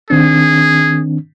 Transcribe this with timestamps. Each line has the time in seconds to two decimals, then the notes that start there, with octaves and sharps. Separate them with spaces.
0.10 D#3 C4 D4 G#4